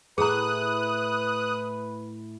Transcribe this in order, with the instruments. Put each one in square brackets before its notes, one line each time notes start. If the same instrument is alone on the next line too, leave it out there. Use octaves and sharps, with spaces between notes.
[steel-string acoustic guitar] A2 E4 [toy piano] G#4 A#5 [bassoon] B4 [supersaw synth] D#6 F#6